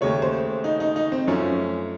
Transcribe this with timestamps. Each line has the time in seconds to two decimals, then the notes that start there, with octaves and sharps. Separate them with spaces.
0.01 D#2 C#3 A3 C#5
0.22 C5
0.64 D#4
0.80 D#4
0.96 D#4
1.12 C4
1.27 F#2 F3 A3 C#4